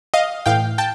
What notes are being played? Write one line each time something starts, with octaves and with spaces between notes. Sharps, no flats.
D#5 F5
A2 E3 F5 G5
G5 A5